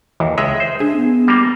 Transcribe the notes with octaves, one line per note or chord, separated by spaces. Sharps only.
D#2 E3
C#2 G#3 E5
C5
D4 G#4
B3
G3 A#3